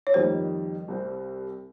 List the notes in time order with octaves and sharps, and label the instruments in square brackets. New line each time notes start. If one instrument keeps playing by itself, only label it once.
[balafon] C#5
[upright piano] F2 D#3 G3 A#3 [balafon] C5
[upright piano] C2 C3 G3 C4